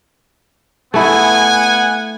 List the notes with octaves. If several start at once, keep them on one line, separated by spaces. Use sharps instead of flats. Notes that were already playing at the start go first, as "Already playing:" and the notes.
A3 B3 E4 D#5 F#5 G#5